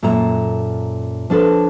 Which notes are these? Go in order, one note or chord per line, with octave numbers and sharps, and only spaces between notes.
F#2 A#2 A4 E5 A#5
F3 D4 A4 B4